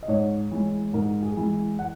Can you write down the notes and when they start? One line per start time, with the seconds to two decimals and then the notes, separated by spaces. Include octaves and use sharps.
0.03 D#5
0.08 G#2 C#5
0.51 E3 G#3
0.93 G#2 A#4
1.22 G#4
1.37 E3 G#3
1.79 F#5